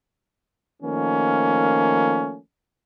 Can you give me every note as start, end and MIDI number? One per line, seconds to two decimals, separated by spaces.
0.82 2.38 51
0.82 2.38 53
0.82 2.38 57
0.82 2.38 58
0.82 2.38 61